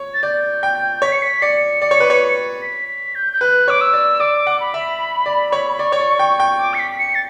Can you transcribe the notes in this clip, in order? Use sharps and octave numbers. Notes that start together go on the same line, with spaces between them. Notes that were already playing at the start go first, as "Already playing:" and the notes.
Already playing: C#5
A6
D5 G6
G5
C#5 B6
C#7
B6
D5 C#7
D5
C#5
B4
C#5
B6
B6
G6
G6
B4 F#6
C#5 D6
E6
D5
D5 D6
F#5
B5
E5
D5
C#5
D5 C#6
C#5
D5
G5
G5
D6
C#7
B6
B6
C#7
A6